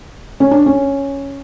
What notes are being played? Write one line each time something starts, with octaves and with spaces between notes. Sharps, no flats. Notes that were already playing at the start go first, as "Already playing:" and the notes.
C#4
D4
C#4